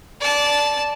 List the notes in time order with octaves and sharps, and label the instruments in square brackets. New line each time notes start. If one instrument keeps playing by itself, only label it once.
[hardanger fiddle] D5 A5